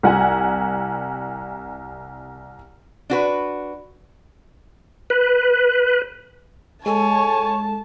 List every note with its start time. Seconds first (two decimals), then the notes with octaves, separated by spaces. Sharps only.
0.03 C2 F#5 G#5
3.10 D4 F#4 B4
5.10 B4
6.86 G#3 A4 C#5 G#5 A5